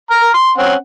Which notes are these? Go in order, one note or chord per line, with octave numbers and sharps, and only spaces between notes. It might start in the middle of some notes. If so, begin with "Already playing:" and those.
A#5 F6
C6
C4 C#4 F#5